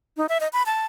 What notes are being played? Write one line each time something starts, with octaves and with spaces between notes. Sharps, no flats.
D#4
E5
D#5
B5
A5